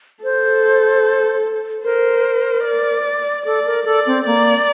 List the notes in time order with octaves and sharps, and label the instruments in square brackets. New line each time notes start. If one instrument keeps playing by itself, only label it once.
[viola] A4 [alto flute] C5
[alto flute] A#4 [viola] C5
[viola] D5
[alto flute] A4 [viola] D5
[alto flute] A#4
[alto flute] A4 [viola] D5
[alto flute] C4
[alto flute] A#3 [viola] D5